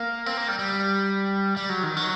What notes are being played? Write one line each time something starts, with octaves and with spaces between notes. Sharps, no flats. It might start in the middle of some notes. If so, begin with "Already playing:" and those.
Already playing: A#3
C4
A#3
G3
G3
G3
F#3
D#3
F#3